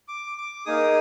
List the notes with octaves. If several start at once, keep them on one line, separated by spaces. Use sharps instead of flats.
D6
D6
A#3 D#4 G#4 D#6